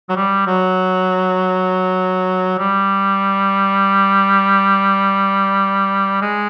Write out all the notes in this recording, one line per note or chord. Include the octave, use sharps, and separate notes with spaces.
F#3
G3
F#3
G3
G#3